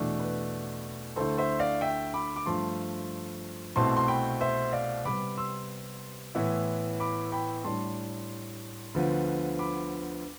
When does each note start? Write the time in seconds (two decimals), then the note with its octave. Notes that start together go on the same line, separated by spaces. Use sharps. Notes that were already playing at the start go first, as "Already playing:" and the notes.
Already playing: E2 B2 A3 D4
0.19 B4
1.16 D2 D3 A3 E4 A4 C5
1.38 C5 E5
1.60 D5 F5
1.81 E5 G5
2.14 B5 D6
2.36 D6
2.46 G2 F3 A3 A5 C6
3.75 C2 B2 A3 C4 A5 C6
3.97 C6
4.08 G5 B5
4.41 C5 E5
4.73 D5 F5
5.05 C3 G3 B3 B5 D6
5.38 C6 E6
6.35 A2 E3 B3 E4
7.00 B5 D6
7.32 G5 B5
7.64 A2 G3 D4 A5 C6
8.94 D2 D3 F3 B3
9.59 B5 D6